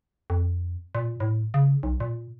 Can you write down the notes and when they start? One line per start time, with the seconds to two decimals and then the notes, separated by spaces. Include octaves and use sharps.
0.30 F2
0.95 A#2
1.20 A2
1.54 C#3
1.83 B1
2.00 A#2